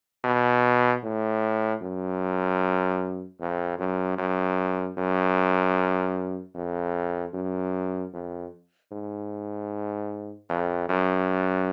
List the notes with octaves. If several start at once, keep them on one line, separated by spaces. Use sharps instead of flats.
B2
A2
F#2
F2
F#2
F#2
F#2
F2
F#2
F2
G#2
F2
F#2